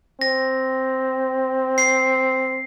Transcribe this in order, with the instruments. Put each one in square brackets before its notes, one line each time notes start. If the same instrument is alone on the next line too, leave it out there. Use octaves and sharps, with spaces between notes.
[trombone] C4 [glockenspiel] A#6
[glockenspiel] C7